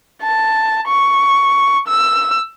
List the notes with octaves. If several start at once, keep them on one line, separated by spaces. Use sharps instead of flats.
A5
C#6
E6